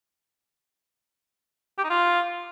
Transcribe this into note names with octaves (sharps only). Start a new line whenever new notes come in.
G4
D#4
F4